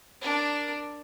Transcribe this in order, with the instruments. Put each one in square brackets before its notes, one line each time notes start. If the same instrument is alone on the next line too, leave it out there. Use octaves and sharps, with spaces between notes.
[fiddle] D4 A#4